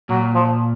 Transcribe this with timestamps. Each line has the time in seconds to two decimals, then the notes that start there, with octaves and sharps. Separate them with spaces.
0.09 A#2 F#3
0.35 F3